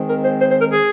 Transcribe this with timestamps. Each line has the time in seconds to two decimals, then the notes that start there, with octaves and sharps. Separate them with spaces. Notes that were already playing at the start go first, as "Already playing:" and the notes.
Already playing: D#3 G#3 C4
0.10 A#4
0.24 C5
0.40 C5
0.50 C5
0.61 A#4
0.72 G#4